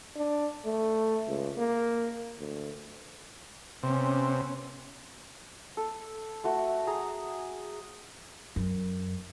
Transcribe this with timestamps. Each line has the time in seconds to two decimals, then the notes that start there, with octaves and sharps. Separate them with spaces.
0.16 D4
0.65 A3
1.28 C#2
1.58 A#3
2.39 D2
3.83 C3 B3 C#4
5.77 A4
6.44 A3 F#4
6.87 G#4 A#5
8.56 F#2